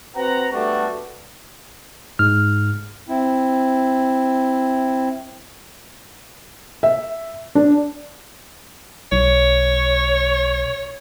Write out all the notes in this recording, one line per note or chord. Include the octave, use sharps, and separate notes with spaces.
C4 F#4 B4 F#5 A#5
G3 A3 B3 D4 F#4
G#2 F6
C4 E4
E5
D4
B1 C#5